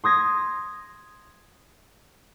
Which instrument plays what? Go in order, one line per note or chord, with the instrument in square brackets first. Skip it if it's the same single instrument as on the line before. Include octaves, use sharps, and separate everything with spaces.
[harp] C6 D#6 G#6 A#6